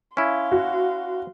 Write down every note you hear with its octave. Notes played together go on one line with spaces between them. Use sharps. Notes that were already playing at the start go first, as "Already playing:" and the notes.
C#4 E4 F5 C6
F#4